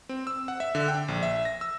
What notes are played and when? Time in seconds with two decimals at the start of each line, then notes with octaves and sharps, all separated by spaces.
0.09 C4
0.27 E6
0.48 F#5
0.60 E5
0.75 D3
0.88 G5
1.08 A#1
1.23 E5
1.45 A#6
1.61 E6